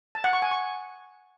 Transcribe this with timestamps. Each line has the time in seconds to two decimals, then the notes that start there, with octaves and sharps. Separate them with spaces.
0.15 A5
0.24 F#5
0.33 C#6
0.42 G#5
0.51 C#6